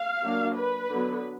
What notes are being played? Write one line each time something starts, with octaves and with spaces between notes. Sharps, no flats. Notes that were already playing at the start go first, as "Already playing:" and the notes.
Already playing: F5
F#3 A#3 D4
B4
D3 F#3 B3